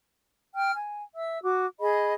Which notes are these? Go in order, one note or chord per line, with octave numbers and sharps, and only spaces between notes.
G5 F6
G#5
E5 E6
F#4 D6
G#4 D#5 B5